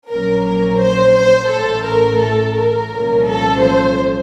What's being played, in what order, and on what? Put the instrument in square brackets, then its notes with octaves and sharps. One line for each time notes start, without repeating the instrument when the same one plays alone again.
[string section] A#1 A#2 F#3 A#3 C#4 A#4
A#4
C5
C5
A1 A2 A3 A4
A#4
A4
A#4
C2 A#2 F3 A3 C#4
A4
C5